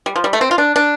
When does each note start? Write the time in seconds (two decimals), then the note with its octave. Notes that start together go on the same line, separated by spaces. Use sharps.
0.06 G3
0.16 F3
0.24 G3
0.33 A3
0.41 C4
0.51 F4
0.58 D4
0.76 D4